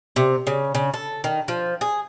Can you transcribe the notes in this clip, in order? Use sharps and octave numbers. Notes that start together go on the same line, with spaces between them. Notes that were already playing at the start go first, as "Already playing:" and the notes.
C3
C#3
C#3
A4
D#3
F3
G#4